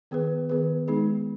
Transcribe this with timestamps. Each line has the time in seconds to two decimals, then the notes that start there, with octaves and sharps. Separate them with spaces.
0.11 D#3 B3 G#4 B4
0.50 D#3 B3 G#4 B4
0.88 G#3 B3 D#4 G#4